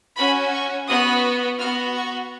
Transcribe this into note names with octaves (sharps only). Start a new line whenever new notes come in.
C#4 F#4 B5
C#6
B3 F#4 D#6
B3 F#4 F6
C#6